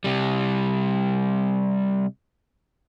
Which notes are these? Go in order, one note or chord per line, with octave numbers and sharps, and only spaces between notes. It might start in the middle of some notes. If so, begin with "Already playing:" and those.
C3 G3